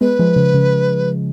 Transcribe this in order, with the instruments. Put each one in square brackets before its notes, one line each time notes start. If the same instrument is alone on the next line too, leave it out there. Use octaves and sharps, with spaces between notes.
[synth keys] G#3 B3 [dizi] B4
[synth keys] F3 G#3
C#3 F3
C#3